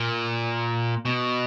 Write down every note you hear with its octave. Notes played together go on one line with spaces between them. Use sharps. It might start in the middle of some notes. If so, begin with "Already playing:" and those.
Already playing: A#2
B2